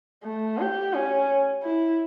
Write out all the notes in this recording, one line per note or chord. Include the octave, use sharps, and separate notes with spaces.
A3
G4
C#4
E4